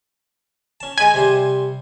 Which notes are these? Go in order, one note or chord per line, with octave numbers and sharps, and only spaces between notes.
C#4 A5
G#3 D#5 G#5 B5
C3 G3 C5